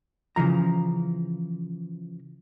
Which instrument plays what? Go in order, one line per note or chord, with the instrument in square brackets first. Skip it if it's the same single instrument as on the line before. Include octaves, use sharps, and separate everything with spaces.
[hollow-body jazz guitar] C#3 E3 F3 A#5